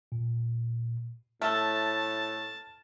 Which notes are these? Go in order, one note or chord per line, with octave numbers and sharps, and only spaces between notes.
A#2
A2 A3 A4 A5 F6